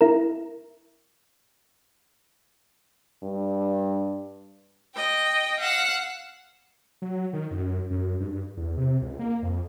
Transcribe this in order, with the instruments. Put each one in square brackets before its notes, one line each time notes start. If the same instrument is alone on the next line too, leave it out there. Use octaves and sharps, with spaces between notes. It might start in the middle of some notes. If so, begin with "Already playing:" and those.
[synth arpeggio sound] E4 A#4
[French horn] G2
[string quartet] D#5 G5
F5 F#5 E6
[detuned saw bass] F#3
D#3
F#2
F#2
G2
E2
C3
C#2
A#3
F2